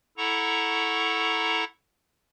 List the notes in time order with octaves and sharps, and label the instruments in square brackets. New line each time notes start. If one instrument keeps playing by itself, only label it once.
[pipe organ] E4 A4 F#5 A#5 C#6